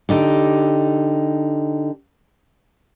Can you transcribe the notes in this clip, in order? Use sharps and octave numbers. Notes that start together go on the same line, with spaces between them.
D3 D#4 G4